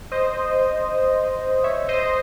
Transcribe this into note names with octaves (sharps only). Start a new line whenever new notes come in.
C5 D#5
C#5 E5
C5 D#5